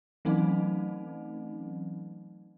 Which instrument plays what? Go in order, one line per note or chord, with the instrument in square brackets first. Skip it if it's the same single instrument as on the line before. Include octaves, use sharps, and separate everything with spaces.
[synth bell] E3 F#3 A3 C4 C#4 D#4